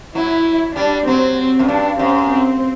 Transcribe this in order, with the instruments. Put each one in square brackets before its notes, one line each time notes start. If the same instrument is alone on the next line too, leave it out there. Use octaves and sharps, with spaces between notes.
[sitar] F#3 [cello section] E4
[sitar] G3 [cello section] D4
[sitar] F#3 [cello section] C4
[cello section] C4
[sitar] F#2
[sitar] G2 [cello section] D4
[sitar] F#2 [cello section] C4
[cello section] C4